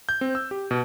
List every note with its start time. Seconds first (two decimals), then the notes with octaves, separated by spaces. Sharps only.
0.09 G6
0.21 C4
0.35 E6
0.51 G4
0.71 B2